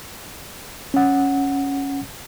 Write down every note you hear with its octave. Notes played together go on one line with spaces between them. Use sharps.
C#4 F#5